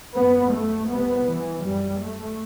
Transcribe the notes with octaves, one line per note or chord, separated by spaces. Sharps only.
F#2 B3
A3
C2 C3 B3
E3
F#2 G3
A3